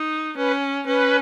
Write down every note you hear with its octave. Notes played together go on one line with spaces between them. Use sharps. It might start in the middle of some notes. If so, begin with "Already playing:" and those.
Already playing: D#4
C#4 B4
C#4 B4